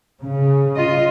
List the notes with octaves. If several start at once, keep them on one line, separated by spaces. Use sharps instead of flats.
C#3
F4 D#5